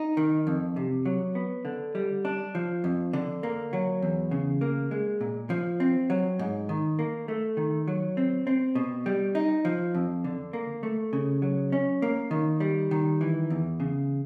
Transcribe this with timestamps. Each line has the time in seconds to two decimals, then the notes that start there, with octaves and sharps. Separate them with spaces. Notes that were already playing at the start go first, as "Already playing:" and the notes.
Already playing: D#4
0.17 D#3
0.47 F2
0.76 C3
1.05 F#3
1.35 B3
1.65 D3
1.95 G3
2.25 D4
2.55 F3
2.84 F2
3.13 D3
3.43 A#3
3.73 F#3
4.02 E2
4.31 C#3
4.61 A#3
4.91 G#3
5.21 A#2
5.50 F3
5.80 C4
6.10 F#3
6.39 G#2
6.69 D#3
6.99 A#3
7.28 A3
7.57 D#3
7.87 F#3
8.17 C4
8.47 C4
8.75 B2
9.06 G3
9.35 D#4
9.65 F3
9.95 F2
10.24 D3
10.53 A#3
10.83 A3
11.13 C#3
11.42 F#3
11.72 C#4
12.02 A#3
12.31 D#3
12.60 G3
12.91 D#3
13.21 E3
13.50 E2
13.80 C#3